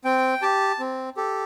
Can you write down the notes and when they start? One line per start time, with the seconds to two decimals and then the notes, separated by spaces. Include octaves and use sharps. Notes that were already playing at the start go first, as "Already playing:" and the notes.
0.04 C4 G5
0.42 G4 A5
0.79 C4
1.17 G4 A4